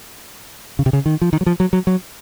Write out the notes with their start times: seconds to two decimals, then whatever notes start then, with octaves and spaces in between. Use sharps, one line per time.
0.79 C#3
0.86 C3
0.93 C#3
1.06 D#3
1.21 F3
1.33 D#3
1.41 F#3
1.46 F3
1.60 F#3
1.73 F#3
1.87 F#3